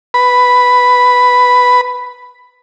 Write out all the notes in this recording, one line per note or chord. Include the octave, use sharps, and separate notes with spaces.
B4 B5